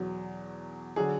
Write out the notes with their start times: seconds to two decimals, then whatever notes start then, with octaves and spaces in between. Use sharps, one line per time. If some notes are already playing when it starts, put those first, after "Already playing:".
Already playing: E2 B2 F#3
0.96 D3 F#3 G#4